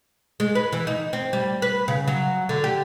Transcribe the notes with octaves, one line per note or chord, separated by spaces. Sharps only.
G#3
B4
E3
D#4
C4
G3
B4
C#3
F#3
D3
G4